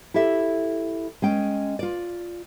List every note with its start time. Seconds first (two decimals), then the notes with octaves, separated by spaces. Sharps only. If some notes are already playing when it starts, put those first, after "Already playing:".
0.14 E4 G4 A4 E5
1.22 G#3 C#4 G5
1.79 F4 D5